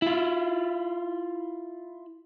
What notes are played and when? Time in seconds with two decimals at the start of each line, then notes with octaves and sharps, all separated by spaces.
0.02 E4 F4